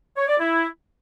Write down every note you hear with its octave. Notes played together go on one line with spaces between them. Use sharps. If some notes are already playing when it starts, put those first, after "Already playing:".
C#5
D5
E4